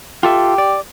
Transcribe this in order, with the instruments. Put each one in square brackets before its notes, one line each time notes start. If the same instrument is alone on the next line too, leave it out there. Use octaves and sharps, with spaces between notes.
[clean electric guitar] F4 A4 E5 [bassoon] G4
[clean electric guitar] D5